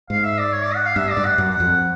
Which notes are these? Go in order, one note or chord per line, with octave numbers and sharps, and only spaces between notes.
G#2 F5
E5
D5
C#5
D5
F#5
F5
G2 E5
D5
G2
F#5
F#2
F#5
F2